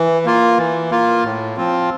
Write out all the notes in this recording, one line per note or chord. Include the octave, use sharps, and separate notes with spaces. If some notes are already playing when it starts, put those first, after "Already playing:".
Already playing: E3
A#3 F4
E3
A#3 F4
A2
F3 C4 F4